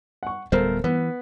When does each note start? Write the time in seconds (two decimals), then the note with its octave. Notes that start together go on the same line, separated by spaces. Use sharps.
0.23 F#5 C#6
0.52 D1 G3 B3 A4 A#4 C5
0.84 E3 B3